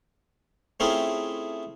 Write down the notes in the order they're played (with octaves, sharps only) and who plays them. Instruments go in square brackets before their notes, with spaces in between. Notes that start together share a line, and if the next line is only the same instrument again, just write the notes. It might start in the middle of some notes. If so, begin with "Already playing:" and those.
[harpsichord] A3 C4 C#4 E4 F4 G#4